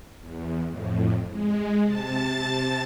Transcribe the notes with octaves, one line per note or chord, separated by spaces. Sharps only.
E2
F2 A2
G#3
C3 A5 A6